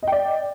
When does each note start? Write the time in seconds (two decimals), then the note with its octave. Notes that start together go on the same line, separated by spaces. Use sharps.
0.03 D#5
0.07 G5
0.12 D5